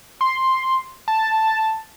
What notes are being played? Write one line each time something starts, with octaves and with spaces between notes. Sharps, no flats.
C6
A5